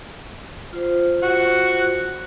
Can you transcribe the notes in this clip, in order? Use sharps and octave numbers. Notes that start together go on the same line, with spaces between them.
F4 C5
F#4